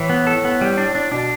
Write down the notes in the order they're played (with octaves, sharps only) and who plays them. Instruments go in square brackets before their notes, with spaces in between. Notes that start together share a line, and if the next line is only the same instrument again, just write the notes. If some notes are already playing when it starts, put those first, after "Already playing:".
Already playing: [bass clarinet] A2 [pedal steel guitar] E3
[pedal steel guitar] B3
A4
B3
G3
D4
D4
[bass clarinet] B2 [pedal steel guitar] D4